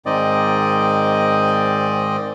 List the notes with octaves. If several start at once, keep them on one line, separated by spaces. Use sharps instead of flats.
G#2 D#3 C4 D5 D#5